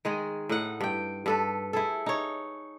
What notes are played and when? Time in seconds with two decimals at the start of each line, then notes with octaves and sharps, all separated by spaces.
0.05 D#3 G#3 G#4
0.49 A2 D#4 F#5
0.81 G2 G5
1.26 G2 A4 B4
1.73 E4 G#4 A4
2.06 D#4 C#5